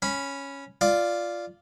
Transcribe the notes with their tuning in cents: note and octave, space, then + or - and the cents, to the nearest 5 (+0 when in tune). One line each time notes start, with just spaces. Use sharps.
C#4 +0 B5 +0
F4 -5 D5 +0